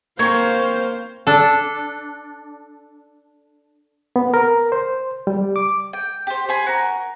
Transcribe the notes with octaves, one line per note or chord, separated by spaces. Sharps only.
A#3 C4 C5 F5 C#6 G#6
D4 A4
B3
A#4
C5
G3
D6
G5
G4 C5
C5 G#5 B5
F#4 A#4